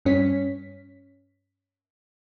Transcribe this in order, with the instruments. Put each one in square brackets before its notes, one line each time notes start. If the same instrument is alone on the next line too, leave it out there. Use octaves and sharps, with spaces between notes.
[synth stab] G2 C#4 B6